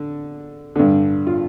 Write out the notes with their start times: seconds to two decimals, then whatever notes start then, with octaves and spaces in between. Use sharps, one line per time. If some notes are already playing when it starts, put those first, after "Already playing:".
Already playing: D3
0.76 G2 D3
1.27 F4